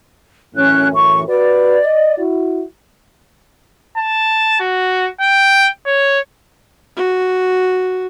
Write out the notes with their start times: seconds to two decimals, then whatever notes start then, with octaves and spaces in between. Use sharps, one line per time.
0.55 F#2 A2 E3 C#4 F#6
0.94 C#6
1.28 F#4 B4 D5
1.85 D#5
2.18 E4 F#4
3.98 A5
4.60 F#4
5.20 G5
5.86 C#5
6.97 F#4